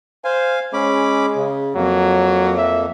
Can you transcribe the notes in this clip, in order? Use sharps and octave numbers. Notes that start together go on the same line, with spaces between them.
C5 F5 G#5
G#3 C#4 B5 D6
C#3
F2 F#3 A#3
E5